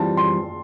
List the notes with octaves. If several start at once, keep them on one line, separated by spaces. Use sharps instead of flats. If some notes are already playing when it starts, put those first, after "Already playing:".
Already playing: E3 G3 C4 F4 A5
C6